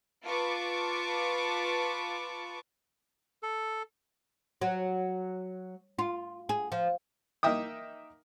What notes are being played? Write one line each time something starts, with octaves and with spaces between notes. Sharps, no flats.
F4 B4 A5 C#6 D6
A4
F#3
F4
G#4
F3
A#3 D#4 D#5 E5 G5 D#6